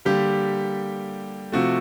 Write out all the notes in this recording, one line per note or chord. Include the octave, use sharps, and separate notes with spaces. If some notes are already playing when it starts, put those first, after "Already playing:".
D3 G3 A#3 G4
C3 F3 A3 F#4